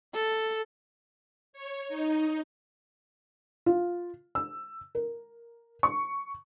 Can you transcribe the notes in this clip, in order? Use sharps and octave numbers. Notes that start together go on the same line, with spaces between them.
A4
C#5
D#4
F4
E6
A#4
C#6